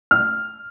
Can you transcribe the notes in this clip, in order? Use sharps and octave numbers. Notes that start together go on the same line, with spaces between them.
F6